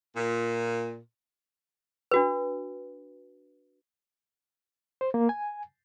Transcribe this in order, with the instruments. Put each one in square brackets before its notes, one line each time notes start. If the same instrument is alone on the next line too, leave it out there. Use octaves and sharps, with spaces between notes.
[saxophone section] A#2
[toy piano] D4 F#4 B4
[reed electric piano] C5
A#3
G#5